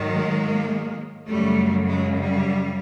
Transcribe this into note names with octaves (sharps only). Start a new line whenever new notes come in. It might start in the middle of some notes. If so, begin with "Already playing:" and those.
Already playing: G#2 D#3 F#3
G#3 A#3
F#2 C#3 F#3 G3 A3
F#3 G#3
G3